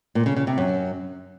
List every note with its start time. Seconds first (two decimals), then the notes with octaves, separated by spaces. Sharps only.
0.15 A#2
0.26 C#3
0.36 C#3
0.47 C3
0.58 F#2